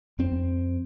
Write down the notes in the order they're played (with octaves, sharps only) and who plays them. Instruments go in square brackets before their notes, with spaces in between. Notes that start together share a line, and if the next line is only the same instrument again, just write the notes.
[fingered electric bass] F2 C4